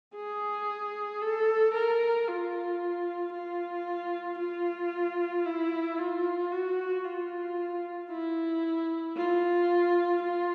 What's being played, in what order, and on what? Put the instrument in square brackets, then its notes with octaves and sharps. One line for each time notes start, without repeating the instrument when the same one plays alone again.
[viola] G#4
A4
A#4
F4
F4
F4
E4
F4
F#4
F4
E4
F4
F4